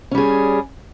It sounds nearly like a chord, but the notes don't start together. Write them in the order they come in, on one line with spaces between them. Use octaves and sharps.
C#4 G3 G#4